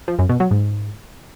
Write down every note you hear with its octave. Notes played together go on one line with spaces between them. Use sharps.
F3
F#2
B2
F#3
G#2